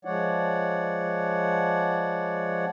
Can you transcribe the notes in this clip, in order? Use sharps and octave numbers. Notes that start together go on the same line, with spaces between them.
F3 G#3 C#5 D5 F#5